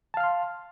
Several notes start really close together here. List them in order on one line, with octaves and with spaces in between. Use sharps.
A5 F5 F6 C6